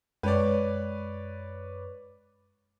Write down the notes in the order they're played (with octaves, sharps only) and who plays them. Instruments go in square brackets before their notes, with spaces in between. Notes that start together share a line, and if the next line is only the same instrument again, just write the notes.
[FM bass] F#2 [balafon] G#3 [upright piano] B4 C#5 D5